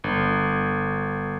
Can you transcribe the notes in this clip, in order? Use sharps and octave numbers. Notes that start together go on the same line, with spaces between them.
G1